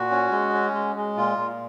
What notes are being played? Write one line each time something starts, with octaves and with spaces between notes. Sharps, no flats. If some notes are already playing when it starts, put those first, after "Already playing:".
Already playing: A#2 F#4
C#4
G#3
C#4
G#3
G#3
A#2 F4
A#2